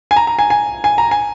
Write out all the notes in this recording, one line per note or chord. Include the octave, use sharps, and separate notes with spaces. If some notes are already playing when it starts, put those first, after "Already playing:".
G#5
A#5
A#5
G#5
G#5
G#5
A#5
G#5